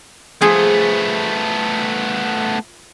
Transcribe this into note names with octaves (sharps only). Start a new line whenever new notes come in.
F3 A3 B3 G#4